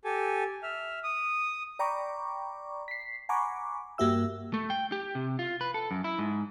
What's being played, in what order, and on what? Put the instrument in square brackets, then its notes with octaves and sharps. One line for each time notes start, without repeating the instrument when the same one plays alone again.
[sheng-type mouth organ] G4 A4 G#5
E5 F6
D#6
[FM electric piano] D5 G5 A#5 B5 C#6 D6
B6 C7
F#5 G#5 A#5 B5 C#6 D6
G2 A#3 F#4 G4 E5 E6
[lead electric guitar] A3
G5
G4
C3
F4
B4
A4
F#2
E4
G#2